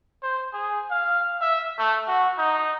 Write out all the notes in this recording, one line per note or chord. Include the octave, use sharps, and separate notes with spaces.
C5
G#4
F5
E5
A3
F#4
D#4